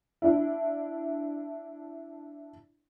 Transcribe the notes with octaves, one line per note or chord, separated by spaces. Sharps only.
D4 E4